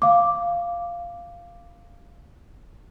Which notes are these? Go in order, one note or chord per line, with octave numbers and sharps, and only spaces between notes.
F5 D6